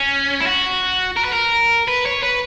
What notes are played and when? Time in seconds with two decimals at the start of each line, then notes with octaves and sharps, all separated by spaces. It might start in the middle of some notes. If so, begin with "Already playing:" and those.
Already playing: C#4
0.40 E4
0.46 F#4
1.17 A#4
1.25 B4
1.33 A#4
1.88 B4
2.06 C#5
2.23 B4